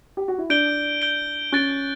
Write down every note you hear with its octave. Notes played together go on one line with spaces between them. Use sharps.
G4
F#4
E4
D4 G6 D7 G7
G6 D7 G7
C#4 F#6 A6 D7 G7